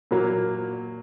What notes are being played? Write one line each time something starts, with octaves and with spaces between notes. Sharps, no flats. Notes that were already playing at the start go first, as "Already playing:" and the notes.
A#2 F#3 A#3